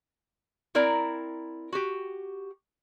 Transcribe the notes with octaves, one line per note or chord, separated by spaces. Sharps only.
C4 E4 A#4 D5 A#5
F#4 G4